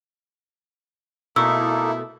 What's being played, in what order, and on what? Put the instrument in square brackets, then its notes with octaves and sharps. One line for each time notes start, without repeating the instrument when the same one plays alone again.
[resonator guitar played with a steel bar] B2 A3 [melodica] A#3 D#4 A4 [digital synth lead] E4 [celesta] E6